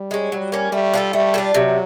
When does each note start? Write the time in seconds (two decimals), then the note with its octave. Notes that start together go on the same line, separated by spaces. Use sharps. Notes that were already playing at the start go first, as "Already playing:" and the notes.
Already playing: G3
0.11 G#3 C#4
0.32 F#3 G3
0.52 A#3 C#4
0.72 G3 A3
0.93 D4 F4 A4
1.13 G3 A3
1.34 D4 F4 A4
1.54 C3 F#3